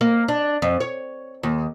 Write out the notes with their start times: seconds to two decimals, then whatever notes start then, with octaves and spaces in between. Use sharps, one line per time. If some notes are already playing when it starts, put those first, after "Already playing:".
0.01 A#3
0.28 D4
0.62 F2
0.80 C#5
1.43 D#2